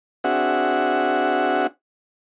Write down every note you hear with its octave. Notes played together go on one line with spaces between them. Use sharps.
C4 D4 F#4 G#4 E5 F#5